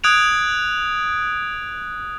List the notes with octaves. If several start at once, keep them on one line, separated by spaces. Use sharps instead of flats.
D#6 F#6 G#6 D7 F7